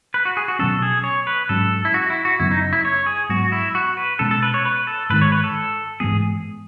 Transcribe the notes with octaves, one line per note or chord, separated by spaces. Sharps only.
B4
F#4
G#4
F#4
B2 F#3 C#4 A4
G#4
C#5
B4
G#2 F#3 C#4 A4
E4
F#4
E4
F#4
F#2 C#3 F#3 B3 E4
D#4
E4
C#5
G#4
G#2 F#3 B3 F#4
E4
F#4
B4
B2 G#3 C#4 A4
A4
B4
C#5
B4
A4
G#2 D#3 G#3 B4
C#5
B4
A4
G#2 E3 G#3 B3 G#4